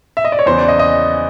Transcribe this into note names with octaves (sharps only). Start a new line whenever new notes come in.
E5
D#5
D5
C#5
E2 C#3 E3 C5
D5
D#5
D#5